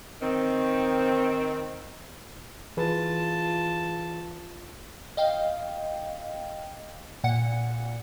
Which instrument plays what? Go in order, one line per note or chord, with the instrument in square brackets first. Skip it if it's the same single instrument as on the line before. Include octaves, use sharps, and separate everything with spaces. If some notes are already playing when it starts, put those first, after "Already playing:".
[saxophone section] D#3 C4
[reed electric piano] E3 G#4 B4 [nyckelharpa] F4 A5
[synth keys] D#5 F5 G5
A#2 F#5 C#7